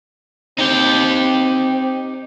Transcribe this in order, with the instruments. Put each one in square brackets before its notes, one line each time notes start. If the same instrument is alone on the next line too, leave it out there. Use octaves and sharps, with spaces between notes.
[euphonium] C4 [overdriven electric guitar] D#4 G4